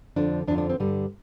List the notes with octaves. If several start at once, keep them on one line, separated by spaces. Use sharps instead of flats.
F2 D3 F3 D4
F2 D3 F3 D4
D4
C4
G2 D3 G3